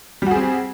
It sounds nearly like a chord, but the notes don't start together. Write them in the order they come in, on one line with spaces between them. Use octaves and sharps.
G3 F#4 G#4 C4